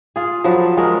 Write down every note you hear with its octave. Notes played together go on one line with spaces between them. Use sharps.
F4 G#4
F3 F#3 A4 B4
G#3 C#4 A#4